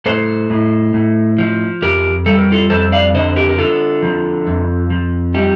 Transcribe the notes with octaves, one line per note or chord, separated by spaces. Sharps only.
A2 A4 C5
A2
A2
F3
F2 G4 A#4
G3 A4
A#4
F4 A4
F2 A4 C5
D5 F5
D3 C5 D#5
G4 A#4
A#4
D3 F4 A4
F3
F2
F3
G3 D#4 G4